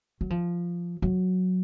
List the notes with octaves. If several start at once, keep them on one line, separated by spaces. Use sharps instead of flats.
F#3
F3
F#3